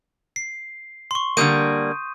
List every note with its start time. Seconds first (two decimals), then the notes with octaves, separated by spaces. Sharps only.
0.36 C7
1.11 C6 C#6
1.37 D3 G3 A#3 D#6 G6 D#7